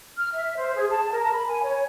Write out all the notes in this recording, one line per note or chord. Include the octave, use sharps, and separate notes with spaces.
F6
E5
C5
G#4
A5
A#4
B5
G#5
C#5